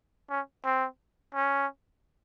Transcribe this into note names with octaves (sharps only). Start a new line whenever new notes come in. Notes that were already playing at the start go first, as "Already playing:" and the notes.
C#4
C4
C#4